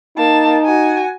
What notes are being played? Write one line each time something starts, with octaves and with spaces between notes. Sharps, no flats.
A#3 D#4 A5
F#4 G#5